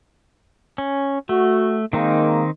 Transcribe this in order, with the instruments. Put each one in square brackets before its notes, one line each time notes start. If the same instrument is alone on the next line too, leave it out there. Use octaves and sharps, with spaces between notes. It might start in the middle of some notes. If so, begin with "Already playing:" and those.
[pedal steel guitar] C#4
[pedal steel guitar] A3 [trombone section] F#4
[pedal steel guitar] D#3 C4 D#4 [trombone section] G#3 A#3